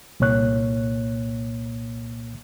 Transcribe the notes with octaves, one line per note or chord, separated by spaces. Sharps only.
C2 A#2 A#3 C#5 F#6